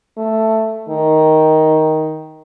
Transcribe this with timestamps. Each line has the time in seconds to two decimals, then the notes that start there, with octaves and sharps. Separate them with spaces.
0.17 A3
0.89 D#3